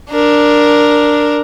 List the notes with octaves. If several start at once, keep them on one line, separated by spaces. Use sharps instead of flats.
D4 A#4